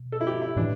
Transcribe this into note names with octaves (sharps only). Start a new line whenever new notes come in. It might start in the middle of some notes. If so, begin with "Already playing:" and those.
Already playing: B2
A4
E4
G4
E4
A2 E3 D4